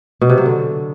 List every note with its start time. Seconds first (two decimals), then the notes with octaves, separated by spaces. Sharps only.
0.21 B2
0.30 C3
0.38 F#3
0.46 D3